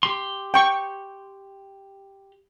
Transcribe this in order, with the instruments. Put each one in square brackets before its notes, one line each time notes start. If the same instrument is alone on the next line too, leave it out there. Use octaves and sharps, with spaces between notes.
[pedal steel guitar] G4 C6
[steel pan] G5 C#6